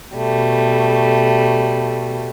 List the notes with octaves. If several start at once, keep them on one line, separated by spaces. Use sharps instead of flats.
B2 G3 A3